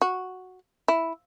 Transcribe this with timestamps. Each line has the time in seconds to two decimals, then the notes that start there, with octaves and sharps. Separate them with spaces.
0.02 F#4
0.88 E4